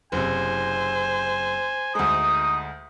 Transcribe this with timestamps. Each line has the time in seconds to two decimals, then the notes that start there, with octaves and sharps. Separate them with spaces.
0.12 F#1 C3 C5 G#5
1.95 D2 G#3 D#4 D#6